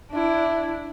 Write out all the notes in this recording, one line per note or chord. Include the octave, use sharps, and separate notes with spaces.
D4 E4